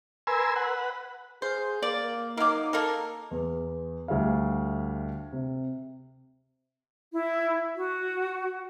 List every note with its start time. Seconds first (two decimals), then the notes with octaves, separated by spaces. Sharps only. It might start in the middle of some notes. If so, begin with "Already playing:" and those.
0.27 A#4 B4 G#5 C6 E6
0.56 B4 F#5
1.42 G#4 C5 F5
1.83 A#3 D5
2.37 F#3 A#3 D#4 D6 F6
2.73 A#3 A4 A#4
3.31 E2
4.08 D2 G3 A3 E5 F5
5.33 C3
7.14 E4
7.75 F#4